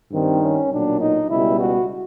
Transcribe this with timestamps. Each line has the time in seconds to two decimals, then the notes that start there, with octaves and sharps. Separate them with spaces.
0.11 G2 D#3 G3 C4
0.41 C#4
0.70 B1 A#2 F#3 D4
1.00 D#4
1.29 C#2 B2 G3 E4
1.59 F#4